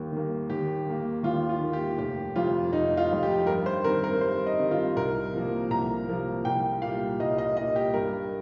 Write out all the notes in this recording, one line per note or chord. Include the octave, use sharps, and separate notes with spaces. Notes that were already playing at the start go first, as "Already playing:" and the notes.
Already playing: D#2 G3 A#3
D#3 G3 A#3
D#2 G4
D#3 A#3
D#2 F4
F4
D#3 A#3
G4
F1 G4
F2 C3 F4
F1 D#4
F4
F2 C3
G4
G2 A#4
C5
D#3 G3 C4 A#4
A#4
G2 C5
D#5
D#3 G3 C4
F4
C2 A#4
C3 F3 A#3
C2 A#5
C3 F3 A#3
C2 G5
A#2 F5
G3
C2 D#5
D#5
A#2 G3 D#5
G4
G2 A#4